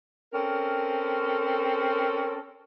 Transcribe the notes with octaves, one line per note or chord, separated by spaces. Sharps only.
C4 C#4 A4 A#4